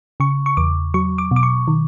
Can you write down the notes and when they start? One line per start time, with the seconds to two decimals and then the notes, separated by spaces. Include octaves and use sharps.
0.20 C#3 C#6
0.46 C#6
0.57 E2 D6
0.94 F#3 C#6
1.18 D6
1.31 B2
1.36 D6
1.43 C#6
1.68 D#3